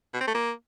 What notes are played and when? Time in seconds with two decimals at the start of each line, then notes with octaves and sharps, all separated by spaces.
0.14 B2
0.21 C4
0.27 A3
0.34 A#3